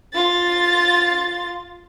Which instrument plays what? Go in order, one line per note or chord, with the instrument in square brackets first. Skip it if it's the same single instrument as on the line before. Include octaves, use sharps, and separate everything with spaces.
[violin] F4 A6